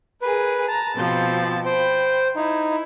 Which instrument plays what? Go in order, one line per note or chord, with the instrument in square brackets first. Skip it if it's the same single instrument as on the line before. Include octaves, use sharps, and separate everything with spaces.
[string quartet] G#4 A#4 [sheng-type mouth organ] B4
[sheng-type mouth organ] A5 [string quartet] A#5
[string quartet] B2 F3 C4
[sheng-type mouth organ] C5 [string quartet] G5 B5
[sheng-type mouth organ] D#4 [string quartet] E4